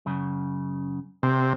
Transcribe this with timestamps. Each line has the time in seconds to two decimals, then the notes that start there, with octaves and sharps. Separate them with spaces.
0.06 F#2 C#3
1.23 C3 C4